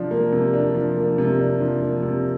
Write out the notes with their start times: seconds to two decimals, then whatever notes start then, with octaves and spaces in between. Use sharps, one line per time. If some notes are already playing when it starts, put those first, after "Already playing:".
Already playing: C3 F3 D4
0.11 A#3
0.32 C3
0.54 D4
0.74 F3
0.97 A#3
1.18 C3
1.39 D4
1.61 F3
1.82 A#3
2.03 C3